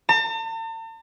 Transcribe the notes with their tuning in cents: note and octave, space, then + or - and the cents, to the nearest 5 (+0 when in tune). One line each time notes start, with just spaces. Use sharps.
A5 +45